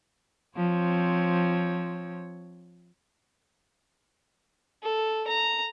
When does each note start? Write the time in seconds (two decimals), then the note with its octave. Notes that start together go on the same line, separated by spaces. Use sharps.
0.57 F3 C4 C#5
4.83 A4
5.28 A#5